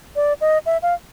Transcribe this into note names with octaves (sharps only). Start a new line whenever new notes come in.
D5
D#5
E5
F5